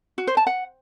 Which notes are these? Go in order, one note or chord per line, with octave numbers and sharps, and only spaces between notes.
F#4
C5
A5
F#5